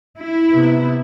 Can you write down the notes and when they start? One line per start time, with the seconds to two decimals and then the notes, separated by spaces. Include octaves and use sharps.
0.19 E4
0.53 C3 B3